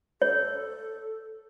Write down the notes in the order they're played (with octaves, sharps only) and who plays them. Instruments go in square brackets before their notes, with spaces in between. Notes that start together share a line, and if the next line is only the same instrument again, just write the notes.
[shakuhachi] A4 [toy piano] C#5